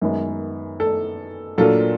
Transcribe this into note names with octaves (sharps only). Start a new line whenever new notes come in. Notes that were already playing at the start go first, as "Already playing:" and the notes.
F#2 D#3 G#3 B3
A4
A#2 F#3 A#3 D4 F4 A4